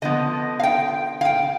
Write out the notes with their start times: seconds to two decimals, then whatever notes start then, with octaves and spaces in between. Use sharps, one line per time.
0.02 D3 F3 B3 D#5
0.60 F5
0.63 G5
1.21 F5
1.25 G5